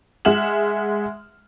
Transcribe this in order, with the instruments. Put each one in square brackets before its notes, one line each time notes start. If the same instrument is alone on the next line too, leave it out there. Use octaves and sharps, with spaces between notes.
[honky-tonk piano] G#3 E5 F#5 F6 E7 F#7